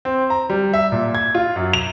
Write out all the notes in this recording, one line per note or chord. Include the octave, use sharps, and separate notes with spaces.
C4
A#5
G3
E5
A#2
G#6
F4
F#2
F7